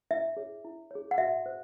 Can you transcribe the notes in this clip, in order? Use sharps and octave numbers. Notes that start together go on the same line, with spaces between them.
E4 E5
G#4 C#5
E4
G#4 C#5
F#5
F#4 E5
C5